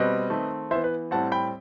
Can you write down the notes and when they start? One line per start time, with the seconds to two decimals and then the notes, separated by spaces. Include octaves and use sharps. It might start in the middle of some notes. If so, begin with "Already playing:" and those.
Already playing: B2 G3 C4 B4 D#5
0.30 D#3 A3 C4
0.71 E3 B3 C5 E5
0.84 B4
1.11 A2 G3 C4 F#5 A5
1.32 G5 B5